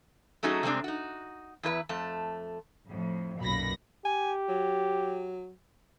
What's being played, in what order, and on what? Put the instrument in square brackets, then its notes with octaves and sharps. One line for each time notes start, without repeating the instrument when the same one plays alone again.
[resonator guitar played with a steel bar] F#3 A3 C#4 D#4 F#4 G#4
C3 G3 G#3 C4 D4
D#4 F#4
E2 E4 B4 E5
F2 A3 A5
[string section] F2 A2
B1 F#2 A#2 B5 A#6
[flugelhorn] G4 [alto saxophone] G#5
[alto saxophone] F#3